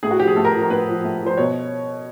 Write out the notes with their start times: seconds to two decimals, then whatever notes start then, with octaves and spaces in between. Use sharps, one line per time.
0.03 A2 G#4
0.11 F#4
0.20 F3 G4
0.28 G#4
0.36 A2 A4
0.45 A#4
0.54 F3
0.62 A#4
0.70 A2 B4
0.87 F3
1.04 A2
1.21 F3
1.26 C5
1.37 B2 C#5